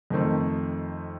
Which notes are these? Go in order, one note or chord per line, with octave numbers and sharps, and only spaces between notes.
F2 D#3 A3 C4